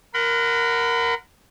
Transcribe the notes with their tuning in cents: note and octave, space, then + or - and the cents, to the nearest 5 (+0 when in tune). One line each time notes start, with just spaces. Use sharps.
A#4 +0 F#5 +0 B5 +35